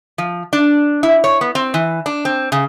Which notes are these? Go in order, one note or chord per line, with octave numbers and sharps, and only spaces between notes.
F3
D4
E4
C#5
B3
C4
E3
D4
C4
C#3